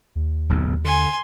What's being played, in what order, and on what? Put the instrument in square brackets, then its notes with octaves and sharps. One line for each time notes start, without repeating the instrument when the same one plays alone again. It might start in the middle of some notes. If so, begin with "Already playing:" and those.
[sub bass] D#2
[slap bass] D1 B1 G#2
[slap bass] D3 [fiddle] G#5 C6